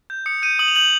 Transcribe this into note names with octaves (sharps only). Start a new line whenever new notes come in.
G6
D#6 C#7
G6 D#7
D#6 F#7
F7
G6 F#7